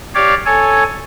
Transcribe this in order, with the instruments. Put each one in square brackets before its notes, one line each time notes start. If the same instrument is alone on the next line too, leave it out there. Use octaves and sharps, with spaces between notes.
[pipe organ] G4 C#5 D5 F5
A4 C#5 G#5